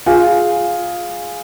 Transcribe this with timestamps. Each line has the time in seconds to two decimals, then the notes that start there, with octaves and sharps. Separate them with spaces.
0.06 F4 G#4